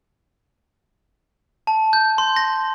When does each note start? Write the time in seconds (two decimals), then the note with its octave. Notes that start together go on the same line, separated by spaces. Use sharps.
1.67 A5
1.93 G6
2.18 C6
2.36 A#6